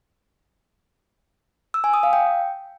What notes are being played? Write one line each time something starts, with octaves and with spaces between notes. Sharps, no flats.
E6
G#5
D#6
F5
G5